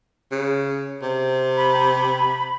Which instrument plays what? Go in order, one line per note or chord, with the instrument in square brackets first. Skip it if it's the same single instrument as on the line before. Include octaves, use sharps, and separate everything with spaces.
[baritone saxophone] C#3
C3
[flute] B5